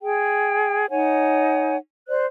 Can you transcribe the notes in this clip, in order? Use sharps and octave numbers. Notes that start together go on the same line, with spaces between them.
G#4 G5
D#4 C#5 F#5 G#5
C5 D5 F#6